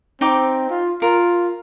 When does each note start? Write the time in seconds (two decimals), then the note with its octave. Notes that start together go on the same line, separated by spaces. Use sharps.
0.21 C4 D#4 G5 D6
0.70 F4
1.02 F4 A#4